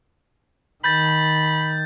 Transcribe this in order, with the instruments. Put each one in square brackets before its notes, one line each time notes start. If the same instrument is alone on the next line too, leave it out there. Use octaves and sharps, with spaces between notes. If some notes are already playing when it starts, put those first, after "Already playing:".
[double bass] D#3 [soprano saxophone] B5 [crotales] G6 A6